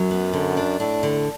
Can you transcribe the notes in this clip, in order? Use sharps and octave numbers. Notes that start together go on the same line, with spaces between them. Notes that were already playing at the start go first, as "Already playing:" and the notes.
Already playing: F#2 F#3
B3
D3
D4
A2 D4
D3